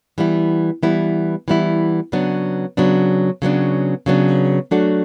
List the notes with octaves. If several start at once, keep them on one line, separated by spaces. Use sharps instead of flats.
E3 G3 B3 E4
E3 G3 B3 E4
E3 G3 B3 E4
C#3 F#3 B3 D4
C#3 F#3 B3 D4
C#3 F#3 B3 D4
C#3 F#3 B3 D4
F#3 A3 D4 F#4 A4